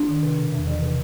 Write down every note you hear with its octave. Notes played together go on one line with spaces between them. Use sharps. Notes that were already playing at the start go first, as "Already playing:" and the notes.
Already playing: D4
D#3
C3
B2
E2
E3
C3